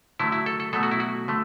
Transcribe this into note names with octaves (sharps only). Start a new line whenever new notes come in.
D3 F#3 A3 E4
E4
A4
A4
B2 F#3 A3 A4
F#4
E4
F#4
D3 A3